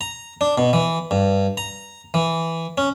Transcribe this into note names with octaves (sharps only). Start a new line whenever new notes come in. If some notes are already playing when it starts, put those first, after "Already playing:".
A#5
D4
B2
E3
G2
A#5
E3
C#4